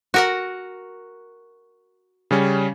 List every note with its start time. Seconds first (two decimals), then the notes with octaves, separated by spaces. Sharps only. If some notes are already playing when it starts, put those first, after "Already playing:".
0.14 F#4 A#4 F#5
2.31 C#3 G3 C#4